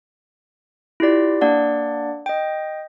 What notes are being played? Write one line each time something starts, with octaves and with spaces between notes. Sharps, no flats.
E4 F4 G4 D5
A#3 D4 D5 F#5
D#5 G5